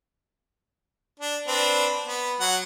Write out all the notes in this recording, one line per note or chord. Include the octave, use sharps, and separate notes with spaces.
D4
C4 D4 B4
B3
F#3 F#5